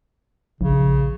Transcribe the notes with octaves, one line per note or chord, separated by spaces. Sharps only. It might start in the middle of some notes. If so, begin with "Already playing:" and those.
A#1 C#3